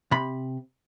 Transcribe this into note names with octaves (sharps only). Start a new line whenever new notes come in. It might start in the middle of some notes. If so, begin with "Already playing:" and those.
C3 B5